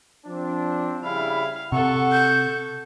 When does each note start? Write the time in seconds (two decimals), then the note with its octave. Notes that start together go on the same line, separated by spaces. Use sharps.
0.27 F3 C4 D4
1.03 C#3 G3 E4 F5
1.72 C3 A4 F#5 C#6
2.12 G6